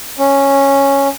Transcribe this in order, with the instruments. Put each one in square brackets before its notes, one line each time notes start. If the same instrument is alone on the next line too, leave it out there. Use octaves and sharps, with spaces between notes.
[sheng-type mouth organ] C#4